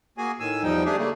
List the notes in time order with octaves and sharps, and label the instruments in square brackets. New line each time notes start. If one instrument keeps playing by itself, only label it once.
[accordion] A#3 F#4 G#4 G#5
A2 D#3 G#5 E6
E2 F3 G3 D#4 G5
G3 A3 D4 G4 G#4
C#3 G3 A3 A#3